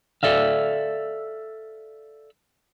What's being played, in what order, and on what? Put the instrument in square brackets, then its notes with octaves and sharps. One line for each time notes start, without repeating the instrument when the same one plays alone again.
[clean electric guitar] A4 D5 E5 F5